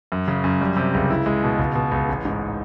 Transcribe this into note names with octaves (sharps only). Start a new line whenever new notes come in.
F#2
C#3
F#2
G3
C3
C#2
E4
G#3
B2
C#2
B2
C#2
A1
G#2